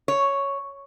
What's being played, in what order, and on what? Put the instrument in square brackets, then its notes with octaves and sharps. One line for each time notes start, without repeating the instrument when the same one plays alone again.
[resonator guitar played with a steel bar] C#5